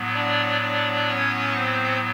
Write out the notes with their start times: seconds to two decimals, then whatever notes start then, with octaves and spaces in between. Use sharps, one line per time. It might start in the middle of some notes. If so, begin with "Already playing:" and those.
Already playing: A2 F#3 B3
0.14 D4 D5
0.61 D4 D5
1.08 C#4 C#5
1.55 C4 C5